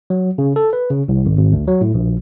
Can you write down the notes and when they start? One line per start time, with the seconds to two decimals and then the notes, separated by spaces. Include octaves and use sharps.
0.10 F#3
0.38 C#3
0.56 A4
0.73 B4
0.91 C#3
1.08 C2
1.26 G#1
1.38 G#1
1.53 D2
1.67 F#3
1.81 A2
1.94 A#1